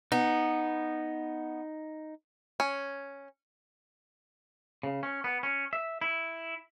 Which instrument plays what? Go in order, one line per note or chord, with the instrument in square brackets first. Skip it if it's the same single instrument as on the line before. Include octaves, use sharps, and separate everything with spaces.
[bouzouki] B3 [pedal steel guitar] D#4
[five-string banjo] C#4
[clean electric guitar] C#3
C#4
B3
C#4
E5
E4